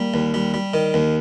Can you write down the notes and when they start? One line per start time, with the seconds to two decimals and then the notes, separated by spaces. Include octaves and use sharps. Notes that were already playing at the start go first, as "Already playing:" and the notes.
Already playing: G3 A#3
0.14 D#2
0.34 G3
0.54 G3
0.74 D#3
0.94 D#2